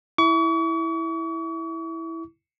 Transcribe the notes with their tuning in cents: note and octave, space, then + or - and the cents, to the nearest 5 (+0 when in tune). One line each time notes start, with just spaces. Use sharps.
E4 -5 C#6 +40